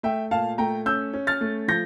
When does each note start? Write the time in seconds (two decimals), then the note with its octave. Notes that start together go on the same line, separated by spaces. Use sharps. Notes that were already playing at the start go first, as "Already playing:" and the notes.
0.03 A3 E5 G5
0.31 A#2 F5 A5
0.58 A3 G5 A#5
0.86 C#4 E6 G6
1.14 C#4
1.27 F6 A6
1.41 A3
1.68 F3 G6 A#6